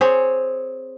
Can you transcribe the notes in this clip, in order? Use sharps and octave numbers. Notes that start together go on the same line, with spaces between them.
C4 G#4 C#5